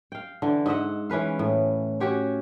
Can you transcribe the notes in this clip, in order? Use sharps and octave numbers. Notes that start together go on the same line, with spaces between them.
F5 G5
D3 E3
G#2 D#5 E5 F#5
E3 C#4 B4 F5
A2
C#4 F#4 G4 C#5